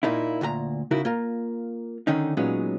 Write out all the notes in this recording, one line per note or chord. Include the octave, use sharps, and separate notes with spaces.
A#2 A#3 D#4 E4
D2 A#2 F#4 A#5
C#3 D#4 E4 F#4 A#4
A#3 F4 A#4
D3 D#3 C#4 D#4
A#2 F#3 G#3 B3 C#4 D#4